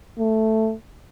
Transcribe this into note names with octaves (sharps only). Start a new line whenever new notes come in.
A3